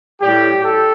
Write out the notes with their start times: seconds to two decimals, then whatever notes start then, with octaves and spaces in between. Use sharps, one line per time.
0.21 A2 G3 G4
0.62 A4